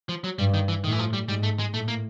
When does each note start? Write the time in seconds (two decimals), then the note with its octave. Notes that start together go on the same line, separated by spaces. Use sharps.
0.09 F3
0.24 F#3
0.39 G2 G3
0.54 D#3
0.68 E3
0.84 A2 D#3
0.92 E3
0.99 F3
1.13 G3
1.29 G#2 G3
1.43 A3
1.59 G#3
1.73 A2 A3
1.88 A#3